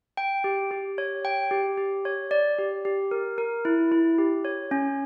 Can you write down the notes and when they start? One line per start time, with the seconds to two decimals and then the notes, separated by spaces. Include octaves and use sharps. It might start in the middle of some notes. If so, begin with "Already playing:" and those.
0.17 G5
0.44 G4
0.71 G4
0.98 C#5
1.25 G5
1.51 G4
1.77 G4
2.05 C#5
2.31 D5
2.58 G4
2.85 G4
3.11 A#4
3.38 A#4
3.65 E4
3.92 E4
4.18 G4
4.45 C#5
4.71 C#4